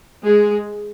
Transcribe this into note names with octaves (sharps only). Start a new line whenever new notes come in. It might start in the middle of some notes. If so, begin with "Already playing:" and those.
G#3 G#4